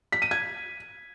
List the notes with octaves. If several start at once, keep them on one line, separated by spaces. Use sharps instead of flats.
B6
D#7
G#6